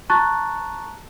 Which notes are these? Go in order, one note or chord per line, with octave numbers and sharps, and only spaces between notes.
A5 A#5 C#6 F#6 A6